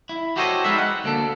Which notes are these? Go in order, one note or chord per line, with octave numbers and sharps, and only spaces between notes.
E4
F#4 G4 A4 C5 C#5 D#5
G3 G#3 D#4 B4 E5
F#5
D2 A#3 A4